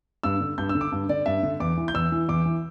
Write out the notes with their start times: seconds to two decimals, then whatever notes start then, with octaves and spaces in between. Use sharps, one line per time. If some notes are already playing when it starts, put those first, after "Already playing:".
0.23 G2 E6
0.40 D3
0.58 G2 G6
0.69 E6
0.75 D3
0.81 D6
0.92 G2
1.09 D3 D5
1.26 G2 E5
1.43 D3
1.60 E2 D6
1.77 E3
1.88 G6
1.94 E2 E6
2.12 E3
2.29 E2 D6
2.45 E3